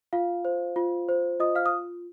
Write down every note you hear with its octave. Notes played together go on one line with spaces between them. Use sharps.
F4 F5
C5
F4
C5
F4 D#5 D#6
F5 F6
D#6